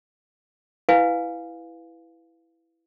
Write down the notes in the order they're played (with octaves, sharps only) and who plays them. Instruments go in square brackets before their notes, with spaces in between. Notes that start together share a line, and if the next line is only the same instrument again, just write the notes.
[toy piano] E4 B4 F5 G#5